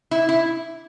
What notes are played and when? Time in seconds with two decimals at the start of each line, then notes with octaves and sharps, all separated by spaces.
0.11 E4
0.29 E4